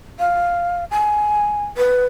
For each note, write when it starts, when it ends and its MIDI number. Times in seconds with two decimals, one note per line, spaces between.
0.19 0.85 77
0.91 1.64 80
1.77 2.06 71